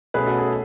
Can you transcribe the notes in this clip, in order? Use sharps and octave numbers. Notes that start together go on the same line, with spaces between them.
B2 A3 C#4 G#4 B4
F#4 A4
G#4